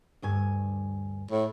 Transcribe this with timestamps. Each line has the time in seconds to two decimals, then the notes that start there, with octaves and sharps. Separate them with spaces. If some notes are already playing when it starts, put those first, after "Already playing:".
0.22 D2 G2 G#5
1.31 A2